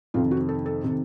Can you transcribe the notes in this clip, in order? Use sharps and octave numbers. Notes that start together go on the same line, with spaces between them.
F2 C3 D#3 F4
F#4
A4
A4
C3 D#3